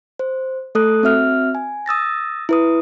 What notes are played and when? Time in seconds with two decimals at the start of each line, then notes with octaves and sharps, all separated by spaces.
0.19 C5
0.75 A3 A4 D#6 F#6
1.03 C4 F#4 E5 F6
1.55 G#5
1.86 D#6 E6 A6 A#6
2.49 E4 B4 D#6